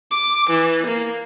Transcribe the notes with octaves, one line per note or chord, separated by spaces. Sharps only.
D6
E3
A#3